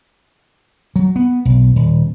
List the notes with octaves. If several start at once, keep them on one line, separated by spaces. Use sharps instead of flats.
F#3
B3
B1
D#1